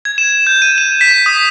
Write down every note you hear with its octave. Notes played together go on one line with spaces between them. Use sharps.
G#6
E7
G6
D#7
E7
B6
D#6